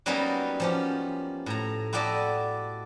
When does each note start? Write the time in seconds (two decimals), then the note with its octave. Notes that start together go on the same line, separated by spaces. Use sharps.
0.06 F#3 G3 A#3 B3 C#4 D#4
0.60 F3 C#4 G4
1.46 A2 A#5
1.93 E4 F#4 G4 A4 D5 D#5